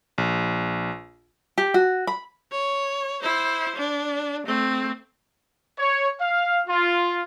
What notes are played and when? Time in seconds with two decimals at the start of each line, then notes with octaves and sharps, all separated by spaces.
0.18 A#1
1.58 G4
1.74 F#4
2.07 B5
2.52 C#5
3.22 E4 C5
3.76 D4
4.47 A3 C4
5.78 C#5
6.20 F5
6.67 F4